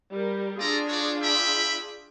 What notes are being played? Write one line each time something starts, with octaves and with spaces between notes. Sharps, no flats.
G3 A#4
D4 F4 G#4 A4 D5 A#5
F#4 C#5 D5
E5 G5 B5